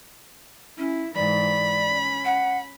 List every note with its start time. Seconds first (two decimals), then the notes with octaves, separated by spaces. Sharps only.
0.78 C#4 E4
1.15 G#2 E3 D5 B5
1.89 C#4
2.25 F#5